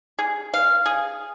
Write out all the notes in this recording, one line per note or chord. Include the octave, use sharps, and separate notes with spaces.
G#4
F5
G#4